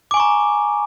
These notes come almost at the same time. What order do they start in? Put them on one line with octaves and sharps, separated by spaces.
D6 G#5 C#6 A#5